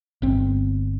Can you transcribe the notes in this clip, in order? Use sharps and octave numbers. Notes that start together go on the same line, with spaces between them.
G1 C4